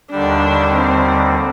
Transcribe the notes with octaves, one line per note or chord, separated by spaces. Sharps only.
D#2 D3 G3 D4
C4